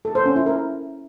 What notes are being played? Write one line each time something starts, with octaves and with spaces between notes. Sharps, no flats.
A4
C5
C#4
E4
A#4